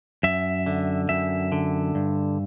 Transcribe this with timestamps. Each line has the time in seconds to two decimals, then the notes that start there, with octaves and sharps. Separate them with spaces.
0.23 F#2 E5
0.66 D3
1.09 F#2 E5
1.52 D3
1.95 G2